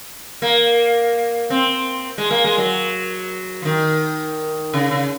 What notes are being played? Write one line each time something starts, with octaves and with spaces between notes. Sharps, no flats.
A#3
C4
G#3
A#3
G#3
F#3
F3
D#3
C#3
C#3